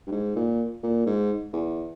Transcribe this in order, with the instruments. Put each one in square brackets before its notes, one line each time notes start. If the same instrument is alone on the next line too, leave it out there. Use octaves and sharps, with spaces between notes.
[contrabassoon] G2
G#2
A#2
A#2
G#2
E2